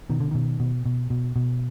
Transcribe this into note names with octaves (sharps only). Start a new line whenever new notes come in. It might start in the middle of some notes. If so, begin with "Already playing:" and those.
B2 D#3
D3
B2 D#3
B2
B2
B2
B2